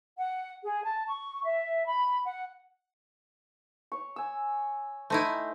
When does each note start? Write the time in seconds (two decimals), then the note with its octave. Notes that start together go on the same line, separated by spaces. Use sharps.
0.18 F#5
0.63 G#4
0.85 A5
1.08 C#6
1.44 E5
1.87 B5
2.26 F#5
3.92 C#5 C#6
4.16 G#5 E6
5.10 A3 D#4 E4 C5